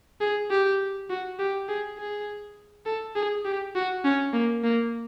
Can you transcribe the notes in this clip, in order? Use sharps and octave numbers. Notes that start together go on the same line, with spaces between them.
G#4
G4
F#4
G4
G#4
G#4
A4
G#4
G4
F#4
C#4
A#3
A#3